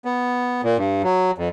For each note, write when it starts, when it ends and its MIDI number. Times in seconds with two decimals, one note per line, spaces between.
0.05 0.61 59
0.64 0.78 46
0.78 1.02 43
1.04 1.31 54
1.38 1.49 41